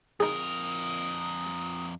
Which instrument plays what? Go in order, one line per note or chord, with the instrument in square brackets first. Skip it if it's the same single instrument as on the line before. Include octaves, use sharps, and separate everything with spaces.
[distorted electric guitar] F2 A#4 [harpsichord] D#4 G#4 [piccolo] D#6